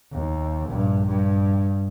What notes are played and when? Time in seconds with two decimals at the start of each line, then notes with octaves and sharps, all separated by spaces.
0.12 D#2
0.66 A#1 G2
1.07 G2